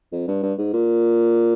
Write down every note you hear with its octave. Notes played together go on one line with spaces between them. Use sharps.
F2
G2
G2
G#2
A#2